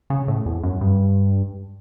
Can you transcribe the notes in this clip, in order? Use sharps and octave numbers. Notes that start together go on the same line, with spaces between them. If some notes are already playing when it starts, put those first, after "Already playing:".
C#3
A2
E2
F#2
G2